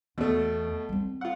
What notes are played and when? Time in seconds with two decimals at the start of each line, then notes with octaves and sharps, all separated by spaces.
0.18 E2 B2 A3
0.89 G3 C4
1.21 F4 F#5